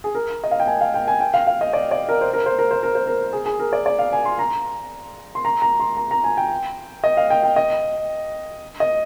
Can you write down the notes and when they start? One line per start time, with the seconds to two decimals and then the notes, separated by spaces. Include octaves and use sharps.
0.04 G#4
0.15 A#4
0.44 D#5
0.51 F5
0.60 G5
0.67 G#5
0.81 F5
0.94 G5
1.08 G#5
1.20 G5
1.34 F5
1.47 F5
1.61 D#5
1.73 D5
1.91 D5
2.09 A#4
2.21 C5
2.34 A#4
2.46 C5
2.59 A#4
2.71 C5
2.83 A#4
2.95 C5
3.07 A#4
3.33 G#4
3.46 G#4
3.59 A#4
3.73 D5
3.86 D5
3.99 F5
4.12 G#5
4.25 C6
4.39 A#5
5.35 C6
5.45 A#5
5.62 A#5
5.80 C6
5.97 A#5
6.11 A#5
6.24 G#5
6.37 G5
7.04 D#5
7.17 F5
7.30 G5
7.43 G5
7.56 D#5
8.80 D#5